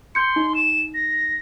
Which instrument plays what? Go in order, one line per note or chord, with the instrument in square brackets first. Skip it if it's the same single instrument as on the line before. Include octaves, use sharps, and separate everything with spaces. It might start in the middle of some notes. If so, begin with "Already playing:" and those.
[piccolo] C6 [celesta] G6 C#7
[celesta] D#4
[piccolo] E7
A#6